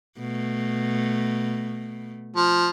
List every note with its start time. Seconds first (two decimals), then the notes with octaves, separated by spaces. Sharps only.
0.19 B2 A3
2.36 F3